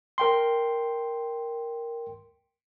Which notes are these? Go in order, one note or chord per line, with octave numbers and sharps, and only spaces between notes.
A#4 G5 C6